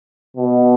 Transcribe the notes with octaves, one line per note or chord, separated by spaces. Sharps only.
B2